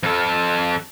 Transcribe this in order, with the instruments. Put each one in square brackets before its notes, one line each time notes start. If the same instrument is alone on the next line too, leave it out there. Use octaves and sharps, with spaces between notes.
[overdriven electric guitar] F2 A4